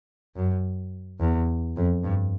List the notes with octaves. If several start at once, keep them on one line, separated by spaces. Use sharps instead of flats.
F#2
E2
F2
G2